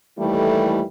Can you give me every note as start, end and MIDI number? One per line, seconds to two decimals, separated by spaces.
0.18 0.82 39
0.18 0.82 52
0.18 0.82 55
0.18 0.82 57
0.18 0.82 64
0.18 0.82 69